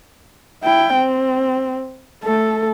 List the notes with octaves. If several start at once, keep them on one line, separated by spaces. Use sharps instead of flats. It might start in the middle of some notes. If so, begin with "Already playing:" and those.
E4 G5
C4
A3 A4